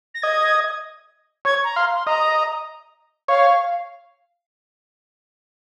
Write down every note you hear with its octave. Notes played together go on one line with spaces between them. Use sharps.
A#6
D#5 G#6
C#5 G#6
A#5
F5 C6
C6
D#5 A#5
C#5 F5